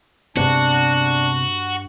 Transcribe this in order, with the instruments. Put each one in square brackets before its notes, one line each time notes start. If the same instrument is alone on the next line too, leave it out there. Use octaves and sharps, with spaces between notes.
[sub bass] G2 [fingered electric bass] C3 G#3 B3 [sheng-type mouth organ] D4 [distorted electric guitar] F#4